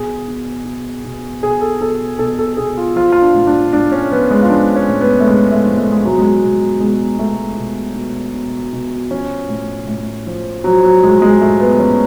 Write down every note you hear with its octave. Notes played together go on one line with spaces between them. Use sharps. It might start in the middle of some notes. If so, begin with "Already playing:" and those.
Already playing: B2 G#4
B2
B2
B2
B2 G#4
A4
B2 A4
B2 A4
A4
B2 G#4
F4
F3 F4
F4
D4
A2
D4
A2 D4
C#4
F3 B3
G#3
F4
F3 D4
C#4
A2
B3
A3
A2 G#3
A3
F3
A3
G#3
B2 F#3
G#3
B2
B2 G#3
B2 A3
B2
B2
B2
B2
F3 C#4
A2
A2
F3
F3 F#3
F#3
A2 G#3
G#3
A2 A3
B3
F3 C#4